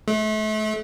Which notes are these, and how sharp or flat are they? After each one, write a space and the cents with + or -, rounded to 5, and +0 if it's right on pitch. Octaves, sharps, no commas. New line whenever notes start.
A3 -35